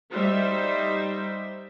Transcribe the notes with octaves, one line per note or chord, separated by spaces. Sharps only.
G3 D#4 C5 E5